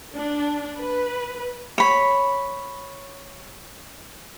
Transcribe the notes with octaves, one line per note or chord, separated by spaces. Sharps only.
D4
B4
C#5 B5